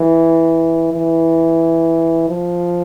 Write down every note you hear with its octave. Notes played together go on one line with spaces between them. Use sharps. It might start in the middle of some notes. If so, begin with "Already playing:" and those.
Already playing: E3
E3
F3